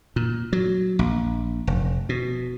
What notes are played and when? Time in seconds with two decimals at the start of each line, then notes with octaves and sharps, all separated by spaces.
0.16 A#2
0.53 F#3
0.99 A#1
1.67 F1
2.09 B2